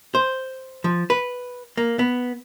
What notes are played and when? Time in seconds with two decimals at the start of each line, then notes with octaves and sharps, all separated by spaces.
0.15 C5
0.84 F3
1.10 B4
1.77 A#3
1.99 B3